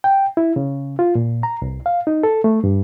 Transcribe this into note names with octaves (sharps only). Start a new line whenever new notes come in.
G5
E4
C#3
F4
A#2
A#5
C2
F5
D#4
A4
A3
G2